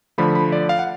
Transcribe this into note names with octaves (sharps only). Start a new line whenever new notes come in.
D3 F3 A3 B5
B5
D5
F5
F#5